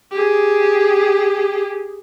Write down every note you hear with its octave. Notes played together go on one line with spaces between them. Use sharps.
G4 G#4